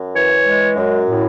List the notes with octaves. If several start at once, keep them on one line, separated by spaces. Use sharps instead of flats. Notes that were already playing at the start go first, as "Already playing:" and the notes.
Already playing: F#2
E3 C#5
G#3
F#2
A2